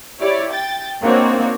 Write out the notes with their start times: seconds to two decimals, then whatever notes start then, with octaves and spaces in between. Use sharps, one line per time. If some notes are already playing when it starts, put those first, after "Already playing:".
0.20 E4 G4 C#5 D5
0.52 G5 A6
1.02 A#3 C4 D4 D#4 F#4 C#5